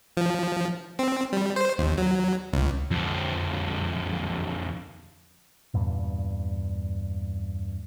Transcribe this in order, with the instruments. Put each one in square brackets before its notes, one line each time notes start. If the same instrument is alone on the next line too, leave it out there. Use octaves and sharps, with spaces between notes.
[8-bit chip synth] F3
C4
G3
C5
D#2
F#3
C#2
[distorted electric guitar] F2 D3
[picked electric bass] E2 G2 A#2